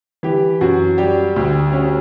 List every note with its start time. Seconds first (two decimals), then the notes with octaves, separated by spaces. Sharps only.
0.23 E3 G4
0.61 F#2 F#4
0.98 G3 G4
1.36 D2
1.73 C#4